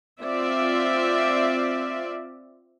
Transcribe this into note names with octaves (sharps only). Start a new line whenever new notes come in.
C4 F4 D5 E5